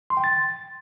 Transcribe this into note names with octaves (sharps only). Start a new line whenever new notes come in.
C6
G5
A6